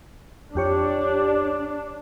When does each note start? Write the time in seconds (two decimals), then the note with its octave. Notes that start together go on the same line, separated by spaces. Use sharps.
0.55 F2 D4 G4 C#5